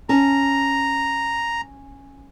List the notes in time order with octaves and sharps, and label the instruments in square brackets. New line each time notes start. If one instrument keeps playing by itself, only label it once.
[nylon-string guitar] C#4 A5 [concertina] A#5